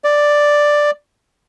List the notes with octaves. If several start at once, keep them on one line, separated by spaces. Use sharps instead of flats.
D5